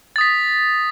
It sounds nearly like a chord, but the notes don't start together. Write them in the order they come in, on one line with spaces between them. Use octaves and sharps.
A6 D#6 B6